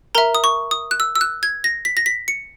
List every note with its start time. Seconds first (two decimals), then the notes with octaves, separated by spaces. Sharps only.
0.15 A#4 E5 A#5
0.35 D#6
0.44 C#6
0.71 D#6
0.91 F#6
1.00 E6
1.15 E6
1.21 F#6
1.43 G#6
1.64 A#6
1.85 B6
1.97 A#6
2.06 B6
2.28 C#7